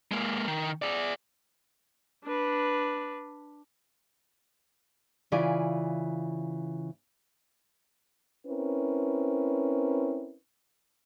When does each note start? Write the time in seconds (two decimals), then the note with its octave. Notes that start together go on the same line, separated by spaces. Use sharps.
0.12 G#3 A#3
0.48 D#3
0.82 G#4 D5
2.24 D4 B4
5.32 C#3 E3 F4 D5 G#5
8.46 C4 C#4 E4 A#4 B4